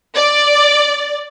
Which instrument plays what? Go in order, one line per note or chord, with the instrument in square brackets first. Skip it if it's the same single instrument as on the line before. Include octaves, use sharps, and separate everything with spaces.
[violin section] D5